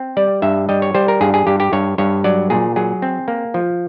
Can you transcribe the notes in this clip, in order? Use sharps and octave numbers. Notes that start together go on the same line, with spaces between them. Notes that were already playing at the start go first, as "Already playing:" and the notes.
Already playing: C4
G3 D5
G2 E5
G3 D#5
C#5
G3 C5
A#4
G2 G#4
G#4
G2 G4
G4
G2 C#5
G2 C#5
F#3 D5
A#2 G#4
F#3 G#4
C4
A#3
F3